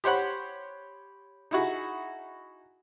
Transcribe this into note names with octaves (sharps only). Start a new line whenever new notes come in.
G4 C5 C#5 F#5 B5
D#4 E4 F#4 G#4